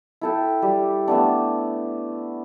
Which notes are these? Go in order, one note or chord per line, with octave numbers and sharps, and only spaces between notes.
E4 A4 G5
G3
A3 B3 D4